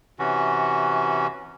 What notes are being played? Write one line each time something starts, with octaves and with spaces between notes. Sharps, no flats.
C3 E3 C#4 F#4